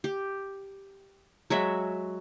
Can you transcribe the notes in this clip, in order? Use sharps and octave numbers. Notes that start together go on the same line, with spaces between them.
G4
F#3 G#3 F#4 E5